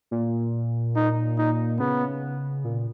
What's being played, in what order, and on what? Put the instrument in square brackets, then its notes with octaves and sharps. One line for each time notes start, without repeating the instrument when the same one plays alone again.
[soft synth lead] A#2
[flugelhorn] D#4
D#4
[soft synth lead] C#3 [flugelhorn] B3
[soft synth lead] A#2